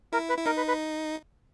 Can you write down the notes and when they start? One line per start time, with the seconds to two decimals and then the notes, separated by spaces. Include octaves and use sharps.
0.13 E4 A#4
0.29 B4
0.38 E4
0.46 D#4 A#4
0.57 B4
0.68 B4